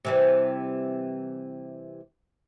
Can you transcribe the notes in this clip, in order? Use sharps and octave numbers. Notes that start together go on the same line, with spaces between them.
C3 E3 G3